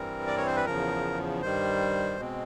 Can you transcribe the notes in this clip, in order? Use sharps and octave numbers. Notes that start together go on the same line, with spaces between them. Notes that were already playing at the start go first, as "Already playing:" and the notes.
Already playing: G2 E3 G3 C4 A#4
D5
C#5
C5
B4
E2 C#3 F3 A#4
G2 D#3 G3 C5
B2 G#3 C4